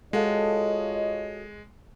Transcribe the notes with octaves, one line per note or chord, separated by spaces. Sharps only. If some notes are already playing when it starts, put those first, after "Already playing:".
G#3 F4 F#4 A4 C#5 D#5 F5